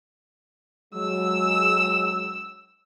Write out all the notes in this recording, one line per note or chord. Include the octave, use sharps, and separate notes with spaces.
F#3 G#3 E6